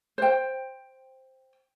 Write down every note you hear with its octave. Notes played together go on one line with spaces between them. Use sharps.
C5 G5